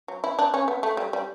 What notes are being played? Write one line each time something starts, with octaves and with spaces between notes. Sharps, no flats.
F#3
E4
D4
C#4
B3
A3
G3
G3